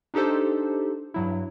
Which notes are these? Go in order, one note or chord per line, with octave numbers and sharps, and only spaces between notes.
D4 D#4 G4 A4 C5
G2 F#3 E4